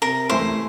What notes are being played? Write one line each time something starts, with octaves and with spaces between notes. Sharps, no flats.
C3 A#4
E3 A3 E4 C5